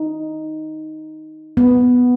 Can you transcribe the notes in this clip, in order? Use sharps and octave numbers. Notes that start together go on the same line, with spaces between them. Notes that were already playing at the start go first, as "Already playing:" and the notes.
Already playing: D#4
B3